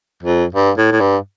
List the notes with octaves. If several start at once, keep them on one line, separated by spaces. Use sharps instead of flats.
F2
G2
A2
A2
G2